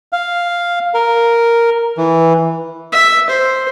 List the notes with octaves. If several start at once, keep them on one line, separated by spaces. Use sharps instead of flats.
F5
A#4
E3
E5
C5